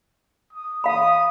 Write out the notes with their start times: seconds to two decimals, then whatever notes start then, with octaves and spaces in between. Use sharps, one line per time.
0.53 D#6
0.84 F5 B5 D#6